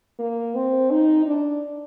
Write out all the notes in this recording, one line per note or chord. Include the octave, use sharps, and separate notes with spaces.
A#3
C4
D#4
D4